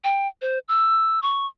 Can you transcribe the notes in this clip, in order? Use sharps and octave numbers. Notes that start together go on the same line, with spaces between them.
G5
C5
E6
C#6